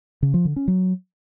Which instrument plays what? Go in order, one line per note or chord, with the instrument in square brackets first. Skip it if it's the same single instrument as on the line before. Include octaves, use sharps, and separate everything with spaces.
[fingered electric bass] C#3
F3
D3
C#4
F#3